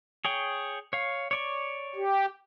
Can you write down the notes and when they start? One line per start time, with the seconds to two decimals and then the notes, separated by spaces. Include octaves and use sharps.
0.25 G#4 C#5 G5
0.93 C#5 F5
1.31 C#5 D5 C#6
1.95 G4